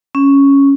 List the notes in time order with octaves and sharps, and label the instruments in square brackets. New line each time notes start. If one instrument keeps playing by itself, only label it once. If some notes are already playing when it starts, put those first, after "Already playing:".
[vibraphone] C#4